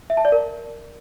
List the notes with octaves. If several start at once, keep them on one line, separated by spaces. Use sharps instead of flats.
E5
A5
D5
A#4